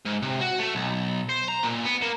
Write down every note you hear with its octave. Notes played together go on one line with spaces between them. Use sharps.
G#2
C3
F#4
A3
B1
C5
A#5
A#2
B3
A#3